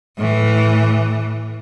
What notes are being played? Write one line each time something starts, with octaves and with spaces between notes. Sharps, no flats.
A2 E3